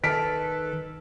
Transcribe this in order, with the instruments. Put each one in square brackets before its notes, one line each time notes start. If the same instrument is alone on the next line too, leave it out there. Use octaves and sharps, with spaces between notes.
[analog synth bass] D#3 [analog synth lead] A4 [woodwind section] B4 [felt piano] F6 B6 D7